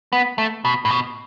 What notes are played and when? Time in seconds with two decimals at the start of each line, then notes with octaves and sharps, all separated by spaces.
0.13 B3
0.38 A3
0.65 B2
0.85 A2
0.90 B2